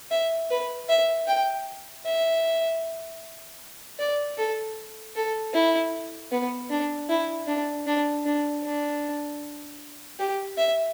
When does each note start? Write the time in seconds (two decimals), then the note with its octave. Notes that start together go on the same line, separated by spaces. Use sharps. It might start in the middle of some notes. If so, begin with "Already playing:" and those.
0.11 E5
0.50 B4
0.89 E5
1.27 G5
2.05 E5
3.99 D5
4.37 A4
5.15 A4
5.53 E4
6.32 B3
6.70 D4
7.09 E4
7.47 D4
7.87 D4
8.25 D4
8.64 D4
10.19 G4
10.58 E5